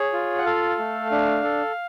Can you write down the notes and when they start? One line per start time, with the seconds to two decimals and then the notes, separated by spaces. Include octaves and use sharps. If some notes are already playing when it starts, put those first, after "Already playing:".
Already playing: G#4 C#5
0.13 F4
0.38 F#5
0.45 A4 F5
0.79 A3
1.12 D4
1.43 A4